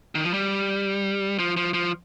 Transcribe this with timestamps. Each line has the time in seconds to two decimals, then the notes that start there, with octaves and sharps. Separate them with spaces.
0.15 D#3
0.24 F3
0.34 G3
1.39 F3
1.57 F3
1.74 F3